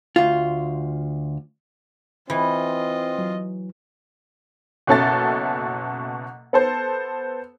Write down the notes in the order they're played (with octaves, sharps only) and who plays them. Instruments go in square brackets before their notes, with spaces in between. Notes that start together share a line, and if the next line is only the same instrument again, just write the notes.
[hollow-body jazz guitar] D2 F4
[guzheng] E3 [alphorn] C4 [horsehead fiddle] F4 D#5
[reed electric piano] F#3
[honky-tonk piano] F#1 B2 C#4 A4 E5 A6
B3 A4 C5